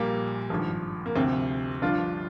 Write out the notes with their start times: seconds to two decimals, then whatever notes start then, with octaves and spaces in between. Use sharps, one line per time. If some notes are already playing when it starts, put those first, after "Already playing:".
Already playing: A#1 A#2 G3 A#3
0.50 G#1 G2 F3
1.06 A#3
1.16 D2 C3 F3 C4
1.82 G1 G2 F3 D4 F4